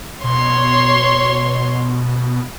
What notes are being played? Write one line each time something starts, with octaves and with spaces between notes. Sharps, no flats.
B2 C#5 C6